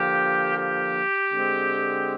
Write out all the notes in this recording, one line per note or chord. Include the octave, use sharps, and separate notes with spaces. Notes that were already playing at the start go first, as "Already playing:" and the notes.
Already playing: D3 F3 A#3 G4
G4
D3 G#3 C4